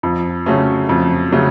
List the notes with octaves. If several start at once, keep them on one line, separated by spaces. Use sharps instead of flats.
F2
C#3 F#3 A3 C#4
F2
C#3 F#3 A3 C#4